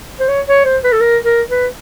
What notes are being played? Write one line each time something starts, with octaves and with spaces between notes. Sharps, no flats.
C5
C#5
C#5
C5
B4
A4
A#4
A#4
B4